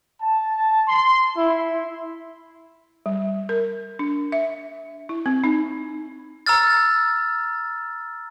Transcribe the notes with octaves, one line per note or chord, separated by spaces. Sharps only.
A5
C6
E4
G3
A#4
D4
E5
E4
C4
D#4
A#5 E6 F6 A6